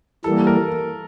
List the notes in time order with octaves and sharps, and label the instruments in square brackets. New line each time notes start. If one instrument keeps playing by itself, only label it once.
[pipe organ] E3 G3 A#3 [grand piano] A4
[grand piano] A#4